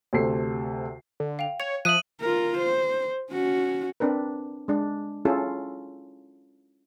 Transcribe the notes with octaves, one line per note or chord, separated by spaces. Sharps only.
D2 C3 A4 C7
D3
F5 G5 F7
C#5 G#6 F7
F3 E5 D#6 F#6 D#7 F#7
F4 A#4
C5
C#4 F#4
C4 D4 A#4 B4
G#3 D4
C#4 E4 F4 G#4 A4